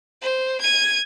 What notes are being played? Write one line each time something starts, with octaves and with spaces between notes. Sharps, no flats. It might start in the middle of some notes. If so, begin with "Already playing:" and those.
C5
G#6 D#7